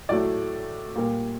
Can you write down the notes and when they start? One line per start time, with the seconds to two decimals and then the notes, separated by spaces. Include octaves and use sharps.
0.09 A2 F#3 A3 D5
0.95 A#2 G3 A#3